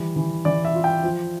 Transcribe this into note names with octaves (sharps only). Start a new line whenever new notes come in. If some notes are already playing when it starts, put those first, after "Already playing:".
Already playing: E3 G3
E3
E3 D5
E5
F4
G5
F3